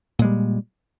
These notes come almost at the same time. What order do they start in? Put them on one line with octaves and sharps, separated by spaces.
A#2 G#3 G3